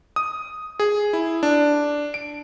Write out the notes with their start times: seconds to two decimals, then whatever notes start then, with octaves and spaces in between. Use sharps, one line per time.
0.16 D#6
0.80 G#4
1.13 E4
1.43 D4
2.14 D7